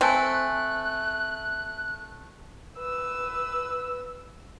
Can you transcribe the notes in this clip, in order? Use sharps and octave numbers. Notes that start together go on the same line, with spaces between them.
A3 C4 G#5 A5 F#6
B4 E6